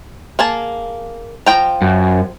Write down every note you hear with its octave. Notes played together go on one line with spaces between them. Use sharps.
A#3 G#4 A5
F3 G5 A#5
F#2